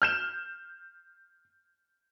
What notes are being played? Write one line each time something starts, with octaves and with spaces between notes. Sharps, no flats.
F6 G6 E7